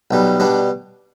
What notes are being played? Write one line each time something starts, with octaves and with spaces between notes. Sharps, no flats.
B1 B2 G3
B2 G3 D4